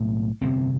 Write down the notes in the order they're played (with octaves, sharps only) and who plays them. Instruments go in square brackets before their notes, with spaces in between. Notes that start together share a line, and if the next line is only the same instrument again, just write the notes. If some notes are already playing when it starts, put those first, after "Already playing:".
Already playing: [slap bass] B1 A2
G1 F2 C3 C4